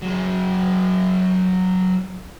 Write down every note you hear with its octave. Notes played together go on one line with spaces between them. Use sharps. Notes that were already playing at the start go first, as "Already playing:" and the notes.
F#3 G#4